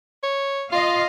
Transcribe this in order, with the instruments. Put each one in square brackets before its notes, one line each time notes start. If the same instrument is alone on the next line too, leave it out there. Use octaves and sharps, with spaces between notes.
[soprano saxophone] C#5
[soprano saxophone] F4 [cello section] D#5 F5